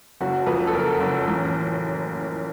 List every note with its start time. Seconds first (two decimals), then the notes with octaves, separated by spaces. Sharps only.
0.21 F#1 F#4
0.47 F2 B4
0.67 A4
0.73 F#1 A#4
1.01 F#1
1.28 A1